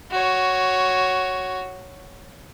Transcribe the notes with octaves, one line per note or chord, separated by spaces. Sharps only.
F#4 C#5